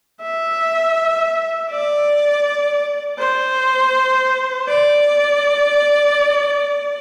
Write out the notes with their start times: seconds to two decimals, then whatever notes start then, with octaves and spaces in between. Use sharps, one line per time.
0.22 E5
1.70 D5
3.19 C5
4.68 D5